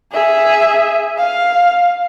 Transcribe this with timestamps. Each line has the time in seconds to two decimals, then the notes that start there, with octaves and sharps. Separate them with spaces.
0.12 G#4 E5
1.18 F5